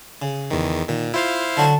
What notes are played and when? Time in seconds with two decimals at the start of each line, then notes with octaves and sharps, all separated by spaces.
0.22 C#3
0.51 E2 D#3
0.88 A#2 D#3
1.14 E4 F4 C5 F5
1.57 D3 F#3 F#4 A5